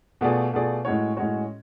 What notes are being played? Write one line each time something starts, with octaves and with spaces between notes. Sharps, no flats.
B2 A3 F4 G#4 D5
B2 A3 F4 G#4 D5
A2 G#3 C#4 F#4 C#5
A2 G#3 C#4 F#4 C#5